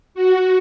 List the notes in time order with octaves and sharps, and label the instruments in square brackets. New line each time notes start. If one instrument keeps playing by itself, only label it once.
[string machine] F#4